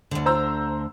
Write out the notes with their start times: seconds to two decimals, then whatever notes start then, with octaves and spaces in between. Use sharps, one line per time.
0.11 D2 D3
0.26 C5 A#5 E6